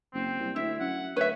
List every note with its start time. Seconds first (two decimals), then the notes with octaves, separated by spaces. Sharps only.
0.14 F#1 C4
0.39 C2
0.56 D2 E4 E5
0.80 F#2 F#5
1.16 D2 B4 C#5 E5